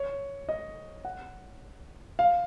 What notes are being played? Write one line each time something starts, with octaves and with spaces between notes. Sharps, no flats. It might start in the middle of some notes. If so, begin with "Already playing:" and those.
Already playing: C#5
D#5
F#5
F5